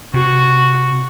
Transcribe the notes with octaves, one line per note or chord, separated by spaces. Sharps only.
C3 F#4